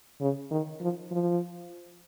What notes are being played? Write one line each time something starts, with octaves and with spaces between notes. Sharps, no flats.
C#3
D#3
F3
F3